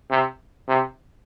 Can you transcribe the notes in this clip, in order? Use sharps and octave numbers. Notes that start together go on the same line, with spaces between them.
C3
C3